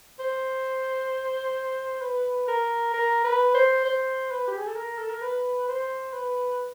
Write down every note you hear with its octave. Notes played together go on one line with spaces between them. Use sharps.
C5
B4
A#4
A#4
B4
C5
C5
B4
G4
G#4
A4
A#4
A4
A#4
B4
C5
B4